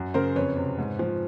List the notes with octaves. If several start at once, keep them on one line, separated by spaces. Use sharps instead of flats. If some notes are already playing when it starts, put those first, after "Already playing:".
Already playing: F#2
C#3 A#4 C5
F2 B4 C#5
C3
G#2
F3